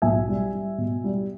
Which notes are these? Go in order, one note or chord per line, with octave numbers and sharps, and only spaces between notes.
B1 E5 G#5
G3
G3
B2
G3